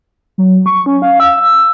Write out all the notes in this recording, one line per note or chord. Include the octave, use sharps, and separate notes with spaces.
F#3
C#6
C#4
F5
E6